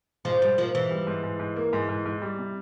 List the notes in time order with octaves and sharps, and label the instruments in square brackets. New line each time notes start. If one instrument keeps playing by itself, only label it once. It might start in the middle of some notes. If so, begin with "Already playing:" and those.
[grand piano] G#2 [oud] F3
[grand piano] G#2 [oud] G3
[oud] F3 [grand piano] A#3
[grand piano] G#2 [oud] E3
[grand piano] G3
G#2
G#2
G#2
A#3
G#2
G#2
G#2
G3
C3